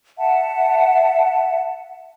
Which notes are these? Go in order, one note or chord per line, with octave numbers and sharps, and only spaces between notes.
E5 F#5 A5